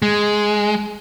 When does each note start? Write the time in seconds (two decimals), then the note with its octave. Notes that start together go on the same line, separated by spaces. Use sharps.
0.02 G#3